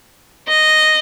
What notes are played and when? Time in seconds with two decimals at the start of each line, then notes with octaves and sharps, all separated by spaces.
0.48 D#5